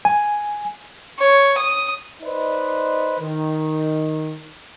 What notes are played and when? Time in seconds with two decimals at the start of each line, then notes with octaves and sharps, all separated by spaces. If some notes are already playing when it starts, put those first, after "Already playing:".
0.05 G#5
1.19 C#5
1.58 D#6
2.23 D#4 B4 C5 D5 D#5
3.19 D#3